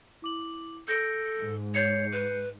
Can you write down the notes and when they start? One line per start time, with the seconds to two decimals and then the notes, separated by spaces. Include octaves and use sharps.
0.22 E4 D6 F#7
0.88 A4 G6 A#6 D7
1.38 G#2
1.75 C#5 G6 C7 C#7
2.12 B4